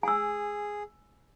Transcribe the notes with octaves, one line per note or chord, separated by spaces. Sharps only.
G#4 G#5 E6